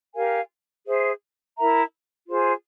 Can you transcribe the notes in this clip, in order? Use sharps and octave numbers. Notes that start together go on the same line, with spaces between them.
G4 A#4 F5 G#5
G#4 C5 E5
E4 A#4 E5 A#5
F4 G#4 C5